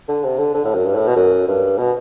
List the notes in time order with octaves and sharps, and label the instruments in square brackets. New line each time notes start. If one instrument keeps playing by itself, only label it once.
[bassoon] D3
C3
D3
D3
A2
F#2
G2
A2
B2
F#2
G2
B2